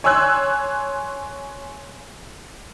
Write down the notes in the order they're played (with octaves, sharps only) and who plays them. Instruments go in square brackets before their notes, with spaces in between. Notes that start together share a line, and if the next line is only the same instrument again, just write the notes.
[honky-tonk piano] C#5 G#5 C6 E6 F#6 G#6